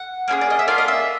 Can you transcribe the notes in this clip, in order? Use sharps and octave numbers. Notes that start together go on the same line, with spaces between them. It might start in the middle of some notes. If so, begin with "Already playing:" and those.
Already playing: F#5
A#3 C#4 F4 G#4
D5
D#5
E5
A#3 D4 F4 F5
D#5
E5